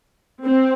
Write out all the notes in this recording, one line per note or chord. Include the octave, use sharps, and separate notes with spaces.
C4